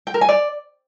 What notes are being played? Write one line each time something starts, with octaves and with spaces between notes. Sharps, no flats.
G5
A#4
G#5
D5